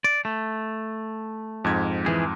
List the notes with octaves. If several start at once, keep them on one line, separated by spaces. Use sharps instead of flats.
D5
A3
F2 G#2 G#6
E3 G#4